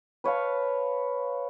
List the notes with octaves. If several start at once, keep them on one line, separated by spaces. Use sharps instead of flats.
B4 C#5 F5 A5